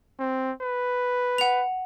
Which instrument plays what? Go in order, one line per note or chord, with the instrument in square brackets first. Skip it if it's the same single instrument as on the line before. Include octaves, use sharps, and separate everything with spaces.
[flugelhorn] C4
B4
[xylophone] F#5 F7